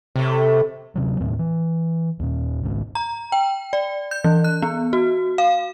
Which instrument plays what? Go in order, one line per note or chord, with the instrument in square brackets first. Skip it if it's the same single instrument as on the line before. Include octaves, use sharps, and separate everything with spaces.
[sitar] A2 A3 [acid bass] C3
[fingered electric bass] D1 C3 F#3
D#2 A2 C4
E3
D#2 A#2
G#1 C#2 G#2
[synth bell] A#5
G5
D5
G6
E3
F#6
B3
F#4
F5